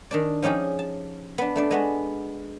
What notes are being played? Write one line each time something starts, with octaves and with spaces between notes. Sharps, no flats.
D#3 D4 D5
F3 C#4 D#4 G4 G#4
A5
B3 D4
A3 D4 D5
G#3 B3 F#4